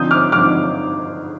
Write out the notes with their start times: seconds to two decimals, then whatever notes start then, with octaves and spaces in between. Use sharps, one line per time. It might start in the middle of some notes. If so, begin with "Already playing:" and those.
Already playing: D3 F3 C4 D#4 D#6 G6
0.11 D6 F6
0.32 D3 F3 C4 D#4 D6 F6